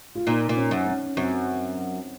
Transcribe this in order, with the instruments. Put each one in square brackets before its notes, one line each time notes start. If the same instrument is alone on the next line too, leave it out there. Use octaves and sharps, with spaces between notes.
[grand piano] F4
[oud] A#2 [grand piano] D#4
[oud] A#2
[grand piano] C#4
[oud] F#2
[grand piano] C#4
[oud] F#2 [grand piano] C4